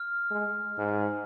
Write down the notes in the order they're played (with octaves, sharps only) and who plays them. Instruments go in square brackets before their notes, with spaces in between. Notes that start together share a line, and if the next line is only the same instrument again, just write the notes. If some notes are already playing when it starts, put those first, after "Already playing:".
Already playing: [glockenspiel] F6
[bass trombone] G#3
G#2